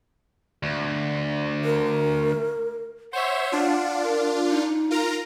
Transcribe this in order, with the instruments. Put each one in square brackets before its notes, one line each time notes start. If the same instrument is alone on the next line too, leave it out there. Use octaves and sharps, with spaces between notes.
[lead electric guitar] D2
[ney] A#4
[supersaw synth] C5 C#5 E5 [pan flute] F#5
[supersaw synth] D4 F4
[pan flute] A#4
D#4
[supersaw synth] F4 A#4 A#5